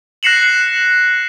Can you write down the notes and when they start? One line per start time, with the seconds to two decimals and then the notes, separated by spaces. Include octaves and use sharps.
0.23 F#6 A#6 C7 C#7 E7 F#7